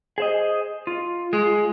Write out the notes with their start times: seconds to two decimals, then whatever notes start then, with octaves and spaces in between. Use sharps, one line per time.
0.18 G#4 C5 D#5
0.87 F4
1.33 G#3